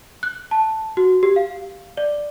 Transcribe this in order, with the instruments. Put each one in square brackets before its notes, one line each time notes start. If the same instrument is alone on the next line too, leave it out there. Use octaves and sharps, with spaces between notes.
[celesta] F#6
A5
F#4
G4
F5
D5